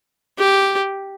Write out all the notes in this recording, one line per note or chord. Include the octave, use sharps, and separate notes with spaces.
G4